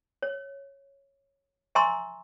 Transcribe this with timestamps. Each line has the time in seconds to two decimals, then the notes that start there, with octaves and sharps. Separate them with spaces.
0.22 C#5
1.75 E5 G#5 A#5 C6 C#6 E6